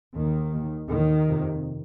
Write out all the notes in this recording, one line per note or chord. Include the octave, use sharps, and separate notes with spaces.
D#2 D#3
D#2
D#2 D#3
F2 C3